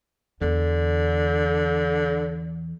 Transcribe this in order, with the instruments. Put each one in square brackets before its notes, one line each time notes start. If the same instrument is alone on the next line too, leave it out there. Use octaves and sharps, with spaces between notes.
[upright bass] E2 [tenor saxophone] D3